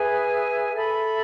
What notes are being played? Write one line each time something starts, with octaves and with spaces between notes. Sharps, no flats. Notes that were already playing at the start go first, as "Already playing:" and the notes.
Already playing: G#4 B4 E5 G#5
A4 E5 B5